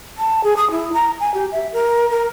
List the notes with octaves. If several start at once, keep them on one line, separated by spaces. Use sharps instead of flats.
A5
G#4
D#6
E4
A#5
G#5
G4
E5
A#4
A#4